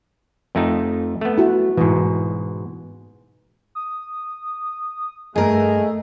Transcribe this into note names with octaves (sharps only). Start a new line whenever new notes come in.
F2 A3 D#4
A3 B3
E4 F#4
G#2 B2 E3
D#6
G2 A3 G#4 A#4 D#5